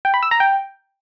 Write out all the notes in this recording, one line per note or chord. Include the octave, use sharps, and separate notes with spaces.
G5
B5
E6
A#5
G5